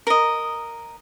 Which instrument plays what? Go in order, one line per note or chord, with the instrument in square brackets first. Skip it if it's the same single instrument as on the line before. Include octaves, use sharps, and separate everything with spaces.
[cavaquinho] A#4 D#5